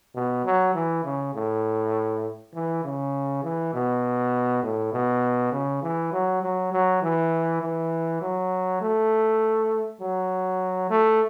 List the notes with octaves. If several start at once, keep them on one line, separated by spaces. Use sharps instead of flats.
B2
F#3
E3
C#3
A2
E3
C#3
E3
B2
A2
B2
C#3
E3
F#3
F#3
F#3
E3
E3
F#3
A3
F#3
A3